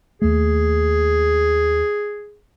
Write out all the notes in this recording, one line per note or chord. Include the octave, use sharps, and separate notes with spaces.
D#2 A3 G#4